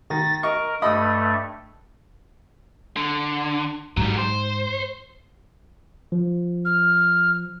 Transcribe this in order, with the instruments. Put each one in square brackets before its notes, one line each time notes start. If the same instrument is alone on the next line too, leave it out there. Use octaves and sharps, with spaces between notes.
[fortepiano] D#3 [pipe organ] A6 A#6
[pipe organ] A#4 [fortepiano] D#5 C#6
[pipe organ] G2 A3 [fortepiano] D#5 B5 D#6
[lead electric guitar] D3
[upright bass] G#2 [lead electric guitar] F#3 G3
[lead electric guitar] C5
[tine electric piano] F3
[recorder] F6